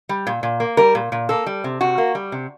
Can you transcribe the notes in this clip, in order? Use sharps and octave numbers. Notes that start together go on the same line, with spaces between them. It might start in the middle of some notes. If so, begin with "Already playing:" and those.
G3
A#2
A#2
A#3
G3 A#4
A#2
A#2
A#3 A4
G3
C3
C3 F#4
A#3
G3
C3